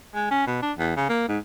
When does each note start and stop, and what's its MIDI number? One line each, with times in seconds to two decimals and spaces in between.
0.15 0.29 56
0.31 0.43 61
0.47 0.61 47
0.62 0.73 62
0.78 0.92 40
0.97 1.06 49
1.09 1.28 58
1.29 1.38 44